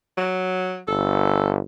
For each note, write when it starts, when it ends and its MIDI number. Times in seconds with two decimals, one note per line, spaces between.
0.17 0.80 54
0.88 1.59 31
0.88 1.53 69